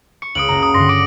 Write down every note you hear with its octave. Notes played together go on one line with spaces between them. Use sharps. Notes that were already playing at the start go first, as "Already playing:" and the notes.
C#6 C#7
C#2 D#6 D7 F#7
F#1 C#2 A#5
D#6
G2 D3 C6 A#6
D6 D7